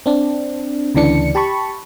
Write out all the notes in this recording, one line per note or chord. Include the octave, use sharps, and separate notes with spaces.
C4 D4
D2 C#3 E3 D4 C#7
G4 A5 B5 C#6